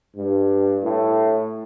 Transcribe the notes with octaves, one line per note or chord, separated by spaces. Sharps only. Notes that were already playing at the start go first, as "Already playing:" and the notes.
G2
A2